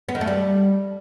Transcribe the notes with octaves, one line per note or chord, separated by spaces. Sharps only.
B3
D#3
A3
G3